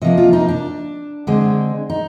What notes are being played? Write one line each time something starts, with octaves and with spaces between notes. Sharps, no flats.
C3 F3 A#3 D#5
F4
D#4
D4
D3 G#3 C4
D#4